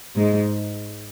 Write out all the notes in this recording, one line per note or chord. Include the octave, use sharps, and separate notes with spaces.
G#2 G#3